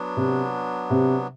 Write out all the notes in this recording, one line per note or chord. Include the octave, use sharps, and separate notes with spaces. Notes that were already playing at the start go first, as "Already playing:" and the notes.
Already playing: F#3 B3 D4
C3
C3